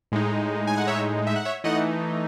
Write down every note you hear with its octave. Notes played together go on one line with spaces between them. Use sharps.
A2 G#3 D#4
G#5
F#5
C#5 E5
E5
F#5
C#5 E5
E3 A3 D#4 D#5 F#5